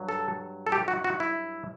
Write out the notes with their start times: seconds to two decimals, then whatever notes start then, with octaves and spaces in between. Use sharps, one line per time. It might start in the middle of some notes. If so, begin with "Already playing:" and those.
Already playing: G2 F#3
0.09 A4
0.67 A4
0.72 G4
0.88 F#4
1.04 F#4
1.20 E4